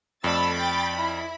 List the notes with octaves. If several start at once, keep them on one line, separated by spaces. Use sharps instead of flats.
F2 A3 D5 B5 E6 A6
G5 A6
E4